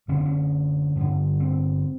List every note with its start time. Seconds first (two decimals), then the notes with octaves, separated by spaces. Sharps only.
0.08 F#2 D3 C#4
0.17 C4
0.25 C#4
0.96 G2 D3
1.40 C4